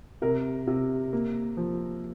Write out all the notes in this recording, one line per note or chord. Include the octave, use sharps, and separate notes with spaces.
C3 A#4
C3
A#3
F3